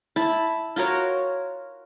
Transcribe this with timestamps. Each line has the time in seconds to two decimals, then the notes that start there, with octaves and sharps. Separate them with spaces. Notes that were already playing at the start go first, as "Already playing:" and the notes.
0.16 E4 A5
0.76 F4 F#4 A#4 C#5